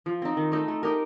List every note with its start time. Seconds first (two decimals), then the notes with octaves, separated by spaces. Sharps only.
0.06 F3
0.22 C4 D#4
0.37 D#3
0.52 A3 D#4
0.68 A3
0.83 D#4 G4 A#4